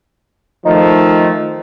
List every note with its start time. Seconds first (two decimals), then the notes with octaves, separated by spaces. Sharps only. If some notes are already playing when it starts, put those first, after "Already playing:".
0.65 D#3 F3 A3 D#4